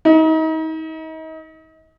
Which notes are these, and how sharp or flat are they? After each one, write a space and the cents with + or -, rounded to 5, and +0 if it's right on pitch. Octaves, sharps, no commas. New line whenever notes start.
D#4 +35